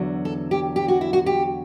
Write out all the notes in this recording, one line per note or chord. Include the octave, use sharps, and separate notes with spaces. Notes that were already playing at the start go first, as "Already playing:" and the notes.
Already playing: E2 D3 F#3
A4
G4
G4
F#4
E4
F#4
G4